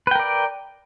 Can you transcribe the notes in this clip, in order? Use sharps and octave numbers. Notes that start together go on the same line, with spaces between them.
A#4 B4 D5 G5